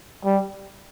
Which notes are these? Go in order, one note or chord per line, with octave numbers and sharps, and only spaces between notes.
G3